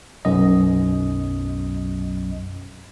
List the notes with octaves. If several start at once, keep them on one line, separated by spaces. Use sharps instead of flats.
B1 F#2 D#5